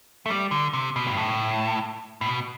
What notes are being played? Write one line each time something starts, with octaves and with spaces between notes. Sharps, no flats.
A3
G3
D3
C3
B2
G2
A2
A2
B2